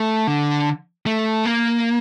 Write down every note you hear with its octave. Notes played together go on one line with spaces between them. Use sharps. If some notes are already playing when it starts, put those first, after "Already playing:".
Already playing: A3
D3
A3
A#3